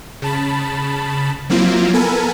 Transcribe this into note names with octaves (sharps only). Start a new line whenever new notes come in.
C#3 A5 B5
F3 F#3 A#3 C4 E4 F4
B3 A4 A#4 G#5 B5